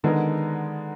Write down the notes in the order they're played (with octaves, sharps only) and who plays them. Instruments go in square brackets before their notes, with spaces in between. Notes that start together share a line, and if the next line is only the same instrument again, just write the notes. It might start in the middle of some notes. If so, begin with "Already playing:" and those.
[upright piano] D3 G#3 B3 D#4 A#4 [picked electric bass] D#3